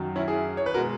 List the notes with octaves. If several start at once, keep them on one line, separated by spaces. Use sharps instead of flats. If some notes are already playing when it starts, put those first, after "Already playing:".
Already playing: F#2 D#3 F#3
C#4 E4
E4 G#4
C#5
B4
B2 G#3 F#4 A#4